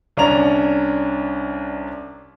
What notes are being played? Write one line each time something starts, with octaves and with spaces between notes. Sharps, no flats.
C2 C#4 D4 A#5 F7